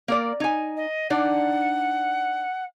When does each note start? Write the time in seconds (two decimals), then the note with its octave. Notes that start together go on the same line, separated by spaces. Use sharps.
0.08 A#3 A#4 D5
0.40 D#4 G#5
0.77 D#5
1.10 D4 D#4 D5 F#5